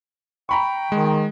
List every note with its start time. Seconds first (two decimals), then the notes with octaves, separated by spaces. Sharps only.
0.49 G5 A#5 B5 C#6
0.92 D#3 G#3